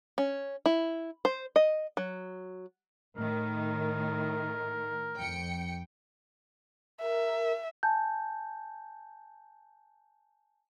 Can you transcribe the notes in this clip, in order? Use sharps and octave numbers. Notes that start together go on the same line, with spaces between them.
C#4
E4
C5
D#5
F#3
A2 D#3 A#4
F2 G5 C#7
A#4 E5
G#5 A5 G6